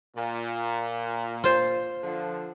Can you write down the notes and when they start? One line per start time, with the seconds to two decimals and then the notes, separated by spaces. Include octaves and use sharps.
0.16 A#2
1.44 F4 C5
2.03 D3 F3